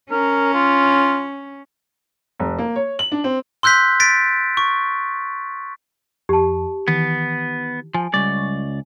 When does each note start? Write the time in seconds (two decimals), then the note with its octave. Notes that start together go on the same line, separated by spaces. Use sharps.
0.11 C#4 A#4
0.54 F4
2.40 F1
2.58 A#3
2.76 C#5
2.99 F#7
3.12 D4
3.24 C4
3.63 C6 E6 F#6 G6 B6
4.00 A6 B6 D7
4.57 C#6
6.29 F2 G4 A5
6.88 D#3 E3 B3
7.94 F3 G#5
8.14 C#2 G3 D5 C#6